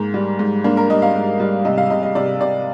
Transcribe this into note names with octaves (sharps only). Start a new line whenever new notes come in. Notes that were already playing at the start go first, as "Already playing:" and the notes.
Already playing: G#2 A#3
G3
G#2
A#3 D4
A#4
G3 D#5
F5
G#2
G3
C3 D#5
F5
C3 D#5
D#5
C3 D5
C3 D5